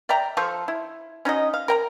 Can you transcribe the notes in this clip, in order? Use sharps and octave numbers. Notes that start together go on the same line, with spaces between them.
D5 E5 G5 A#5
F3 F4 A4 C#6
E4
C#4 D#4 F#4 D#5
F5
A#4 G5 A#5